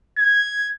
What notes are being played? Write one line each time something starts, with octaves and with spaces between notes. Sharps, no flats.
G#6